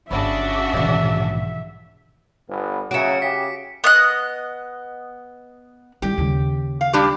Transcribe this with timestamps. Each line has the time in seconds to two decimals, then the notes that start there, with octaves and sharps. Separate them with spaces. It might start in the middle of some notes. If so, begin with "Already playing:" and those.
0.11 G1 C#3 D4 F#4 E5 B5 E6
0.73 A#1 G#2 B2 D#3 E3
2.49 G1 B3
2.91 C#3 F#3 F#4 E5 C#7 D7
3.22 C#3 G4 B6
3.84 B3 D#5 F#6
6.02 G3 E4 G4
6.18 D#2 C#3
6.81 F5
6.93 G3 D4 G4